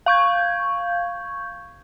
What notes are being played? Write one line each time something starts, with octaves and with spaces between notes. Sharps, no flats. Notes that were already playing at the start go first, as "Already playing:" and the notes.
F5 C#6 G6 G#6